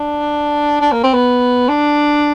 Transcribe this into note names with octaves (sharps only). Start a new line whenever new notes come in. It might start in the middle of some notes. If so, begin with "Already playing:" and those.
Already playing: D4
D4
A#3
C4
B3
D4